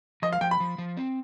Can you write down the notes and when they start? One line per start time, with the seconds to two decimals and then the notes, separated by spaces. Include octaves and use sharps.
0.22 F3 D#5
0.33 F5
0.41 F3 G5
0.51 B5
0.60 F3
0.78 F3
0.97 C4